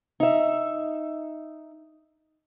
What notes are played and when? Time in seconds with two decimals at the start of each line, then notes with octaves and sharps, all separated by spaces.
0.20 D#4 E5